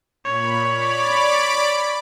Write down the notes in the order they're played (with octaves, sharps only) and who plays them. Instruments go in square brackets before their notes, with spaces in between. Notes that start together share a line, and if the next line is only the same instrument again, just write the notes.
[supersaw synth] A#2 B5 [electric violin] C#5
[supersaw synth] D5 B5 D6